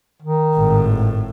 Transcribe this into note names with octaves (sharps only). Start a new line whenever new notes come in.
D#3
G#1 A2